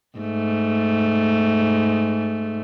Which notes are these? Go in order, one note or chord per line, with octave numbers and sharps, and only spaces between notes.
G#2 A3